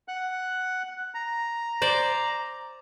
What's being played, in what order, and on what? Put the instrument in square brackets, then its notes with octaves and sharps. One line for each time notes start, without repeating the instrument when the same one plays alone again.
[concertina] F#5 F#6
A#5
[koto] C5 D5